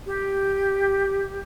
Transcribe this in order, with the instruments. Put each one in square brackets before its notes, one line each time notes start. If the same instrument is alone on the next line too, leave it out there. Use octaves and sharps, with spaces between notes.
[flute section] G4